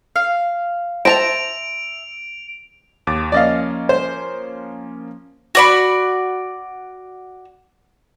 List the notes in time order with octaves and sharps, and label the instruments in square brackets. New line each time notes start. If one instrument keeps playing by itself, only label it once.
[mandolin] F5
[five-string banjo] C5 A5 [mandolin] E5 A#5 [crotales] D7 F7
[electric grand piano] D#2 D6 A6
[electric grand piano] F3 A#3 C#4 [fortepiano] D5 D#5 F5
[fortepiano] C5
[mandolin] F#4 D5 B5